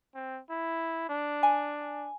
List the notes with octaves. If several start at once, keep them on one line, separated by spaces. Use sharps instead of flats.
C4
E4
D4
G#5